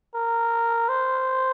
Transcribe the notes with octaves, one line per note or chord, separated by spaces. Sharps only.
A#4
C5